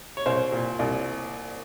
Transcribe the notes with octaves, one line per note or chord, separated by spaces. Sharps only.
C#5
C2 C5
A#2
C2